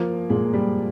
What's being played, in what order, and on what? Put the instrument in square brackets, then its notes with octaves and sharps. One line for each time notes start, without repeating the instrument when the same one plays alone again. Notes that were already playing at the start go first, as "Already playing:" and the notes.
Already playing: [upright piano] F3 [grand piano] A#3
[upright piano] A#2 [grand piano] G#3
[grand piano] G3